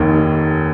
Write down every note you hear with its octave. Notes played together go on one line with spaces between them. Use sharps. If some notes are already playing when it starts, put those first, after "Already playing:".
Already playing: F1 D#2 D#3